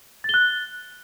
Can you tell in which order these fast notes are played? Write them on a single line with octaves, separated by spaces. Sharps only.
A6 G7 F#6